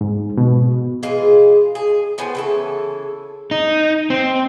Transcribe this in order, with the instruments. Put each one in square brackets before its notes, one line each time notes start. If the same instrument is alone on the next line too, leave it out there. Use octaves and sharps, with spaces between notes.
[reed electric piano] G#2
B2
[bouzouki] E3 G#3 F4 G#4
G#4
A2 B3 C5 G#5
C#3 E3 A4
[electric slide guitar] D#4
C4